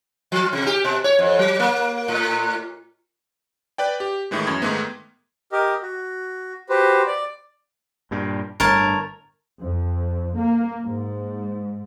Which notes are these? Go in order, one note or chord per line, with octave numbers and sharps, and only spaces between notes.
F3
C3
G4
B2
C#5
F2
F#3
A#3
A2
B4 D5 G5
G4
A2 D#3 E3 G#3
F#2 G#6
G#2 D#3 A3 B3
G4 A#4 D#5
F#4
F#4 G4 B4 C5
D5
G2 A#2
G1 A2 A#4 C#5 A5
F2
A#3
G#2